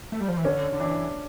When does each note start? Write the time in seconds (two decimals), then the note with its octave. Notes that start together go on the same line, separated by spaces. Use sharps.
0.12 A3
0.20 G3
0.28 F3
0.37 E3
0.44 D3 C#4
0.73 D3
0.80 E3 D4